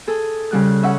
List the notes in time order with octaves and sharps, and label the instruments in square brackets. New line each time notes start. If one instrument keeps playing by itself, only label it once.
[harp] G#4 A4
C#3 G3 F#6
C#4 E5 F#5